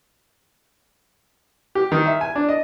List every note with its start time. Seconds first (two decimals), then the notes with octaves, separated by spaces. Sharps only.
1.75 G4
1.92 D#3
2.06 E5
2.21 G#5
2.36 D4
2.49 D#5